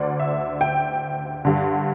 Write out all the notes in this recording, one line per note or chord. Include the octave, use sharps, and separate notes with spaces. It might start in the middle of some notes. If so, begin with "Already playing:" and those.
Already playing: D2 D3 D5
E5
G5
G2 D3